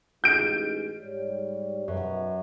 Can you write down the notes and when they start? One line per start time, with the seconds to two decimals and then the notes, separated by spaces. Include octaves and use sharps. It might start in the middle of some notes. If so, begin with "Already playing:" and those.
0.24 A1 G#3 D#4 G6 D7
1.00 G#2 G3 C#5
1.88 B1 F#2